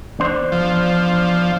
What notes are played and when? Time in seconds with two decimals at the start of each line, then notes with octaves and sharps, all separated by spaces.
0.19 E2 D4 C5
0.52 F3